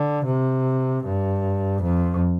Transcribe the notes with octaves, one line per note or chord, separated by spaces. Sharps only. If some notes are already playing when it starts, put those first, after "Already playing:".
Already playing: D3
C3
G2
F2